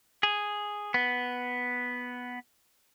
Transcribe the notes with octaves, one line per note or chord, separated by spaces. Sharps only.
G#4
B3